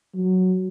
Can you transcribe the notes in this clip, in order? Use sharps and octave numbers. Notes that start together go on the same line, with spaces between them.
F#3